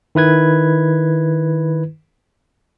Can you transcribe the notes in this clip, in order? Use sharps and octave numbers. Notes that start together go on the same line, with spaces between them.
D#3 E4 B4 G#6